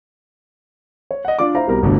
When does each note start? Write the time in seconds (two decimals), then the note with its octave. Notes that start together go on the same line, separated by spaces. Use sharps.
1.11 C#5
1.25 D#5 F#5
1.39 D4 F4 D5 D6
1.55 E4 C5 F5 A#5
1.67 C2 B2 G3 A#4 A#5
1.83 G1 D2 B2 D3